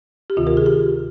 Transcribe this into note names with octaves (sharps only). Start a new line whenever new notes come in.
G4
D2 C3 D#3 F4
A#4
G#4
G4